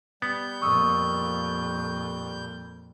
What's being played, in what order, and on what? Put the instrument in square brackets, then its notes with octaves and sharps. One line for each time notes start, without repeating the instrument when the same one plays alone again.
[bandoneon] G3 G6 [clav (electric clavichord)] B3
[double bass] F2 A#2 [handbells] C#6 D#6 E6